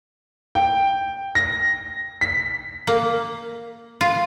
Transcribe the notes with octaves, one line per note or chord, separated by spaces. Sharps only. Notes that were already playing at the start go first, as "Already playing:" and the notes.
G5
A#6
B6
A#3
F4